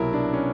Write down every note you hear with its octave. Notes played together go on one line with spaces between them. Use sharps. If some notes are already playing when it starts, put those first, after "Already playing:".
Already playing: C2 B2 F#3 E4 A#4
D4
C#4